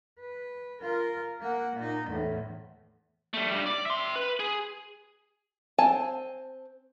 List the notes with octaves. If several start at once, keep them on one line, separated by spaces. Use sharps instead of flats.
B4
F4 A#4
A#3 F#5
A#2 D#4
E2 A2
G3 A3
G2 G3
D5
E5 C6
B4
G#4
C4 G#5 A5